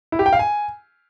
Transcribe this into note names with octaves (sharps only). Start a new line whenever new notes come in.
E4
G4
G5
F5
G#5